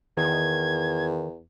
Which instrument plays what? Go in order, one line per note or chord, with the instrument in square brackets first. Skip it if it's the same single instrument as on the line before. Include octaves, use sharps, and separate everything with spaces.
[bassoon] E2 [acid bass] D#3 [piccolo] G#6